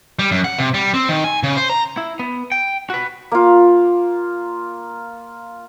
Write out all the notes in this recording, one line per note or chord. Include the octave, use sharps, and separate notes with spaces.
G3
F#2
F#5
C3
G3
C4
D#3
G#5
C#3
C5
A#5
E4
B3
G5
F#4 B4
A#3 F4